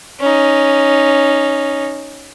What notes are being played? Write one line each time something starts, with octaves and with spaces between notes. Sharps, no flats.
C#4 D#4